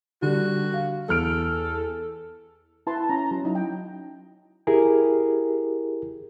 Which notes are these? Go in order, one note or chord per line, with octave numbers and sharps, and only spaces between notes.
D3 G3 F#4
F5
E2 A4 F6 D7
E4 B4 A5 C6
C#4 E4 A#5
F#3
C#4 D#4 E4
G5
E4 G4 G#4 A#4